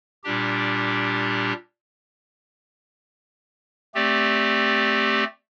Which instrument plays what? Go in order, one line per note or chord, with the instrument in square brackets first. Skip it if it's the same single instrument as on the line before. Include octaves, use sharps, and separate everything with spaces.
[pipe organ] A#2 G3 D4 G4
A3 C4 G4 D5